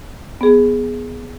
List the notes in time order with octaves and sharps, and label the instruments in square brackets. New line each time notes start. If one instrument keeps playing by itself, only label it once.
[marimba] B3 G#4